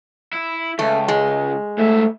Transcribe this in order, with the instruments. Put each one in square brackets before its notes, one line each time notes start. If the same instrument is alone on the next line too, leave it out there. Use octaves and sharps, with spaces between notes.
[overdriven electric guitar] E4
[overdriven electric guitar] C#2 [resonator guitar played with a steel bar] A3
[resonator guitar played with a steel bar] G#3
[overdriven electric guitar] G#2 E5 [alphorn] A3